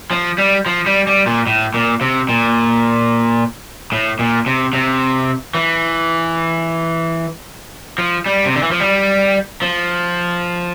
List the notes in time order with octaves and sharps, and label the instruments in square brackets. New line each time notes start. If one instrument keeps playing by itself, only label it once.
[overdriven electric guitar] F3
G3
F3
G3
G3
A#2
A2
A#2
C3
A#2
A2
A#2
C3
C3
E3
F3
G3
C3
D3
E3
F3
G3
F3